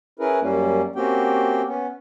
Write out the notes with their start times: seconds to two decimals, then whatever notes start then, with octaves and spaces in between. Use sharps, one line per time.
0.19 C#4 E4 G#4 A#4 B4
0.42 F#2 G3 A#3 C#4
0.96 A#3 C4 C#4 F#4 G4 G5
1.67 B3 C#4